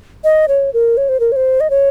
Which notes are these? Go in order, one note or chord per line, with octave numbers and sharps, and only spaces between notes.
D#5
C#5
A#4
C#5
C5
A#4
C#5
C5
D#5
C#5